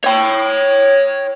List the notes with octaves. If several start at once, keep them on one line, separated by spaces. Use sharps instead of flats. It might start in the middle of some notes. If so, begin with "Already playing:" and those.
C#5 G5